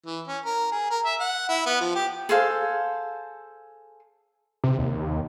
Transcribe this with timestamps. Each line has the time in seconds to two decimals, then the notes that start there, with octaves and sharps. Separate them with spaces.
0.06 E3
0.27 C#4
0.45 A#4
0.72 G#4
0.91 A#4
1.05 E5
1.20 F#5
1.49 E4
1.66 B3
1.80 F3
1.95 G4
2.29 G#4 A4 C5 F5
4.64 C3
4.79 D#2